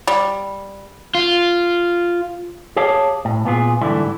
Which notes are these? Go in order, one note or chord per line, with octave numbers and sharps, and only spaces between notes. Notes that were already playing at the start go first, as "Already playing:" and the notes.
G3
F4
G4 G#4 C#5 F5 A5
A2
A#2 B3 F4 G#4
G#2 D3 E3 G3 A3 E4